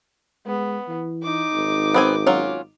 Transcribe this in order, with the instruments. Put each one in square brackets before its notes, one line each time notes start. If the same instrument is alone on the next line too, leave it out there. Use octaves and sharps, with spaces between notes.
[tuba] G#3 [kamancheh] B3
[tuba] E3
[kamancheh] D#4 D6
[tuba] G#1
[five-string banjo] B3 C4 G#5
F#3 C#4 F4